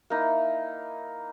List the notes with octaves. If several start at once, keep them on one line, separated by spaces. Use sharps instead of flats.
A#3 D#4 E4